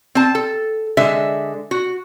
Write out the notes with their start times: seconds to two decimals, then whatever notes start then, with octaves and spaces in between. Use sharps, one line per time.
0.15 C4 A5
0.35 A4
0.97 D3 G#3 E5
1.71 F#4